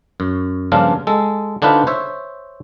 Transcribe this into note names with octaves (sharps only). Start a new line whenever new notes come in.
F#2
G2 C#3 F3 A#3 D4 F4
G#3 A4
D3 D4 D#4 F4 B4 C5
C5 C#5 E5